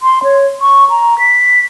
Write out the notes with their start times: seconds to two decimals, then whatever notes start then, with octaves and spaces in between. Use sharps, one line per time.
0.02 C6
0.23 C#5
0.61 C#6
0.90 A#5
1.19 B6